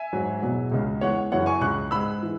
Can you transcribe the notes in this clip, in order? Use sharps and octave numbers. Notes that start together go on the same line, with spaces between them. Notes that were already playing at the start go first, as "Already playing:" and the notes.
Already playing: E5 G#5
G#2 F#3
E2 B2 F#3
C#2 C#3 G#3
E2 E3 G#3 C#5 F#5
F#2 C#3 E3 C#5 F#5
G#5 C#6
C#2 C#3 G#3 C#6 F#6
G#2 G#3 B5 E6
E3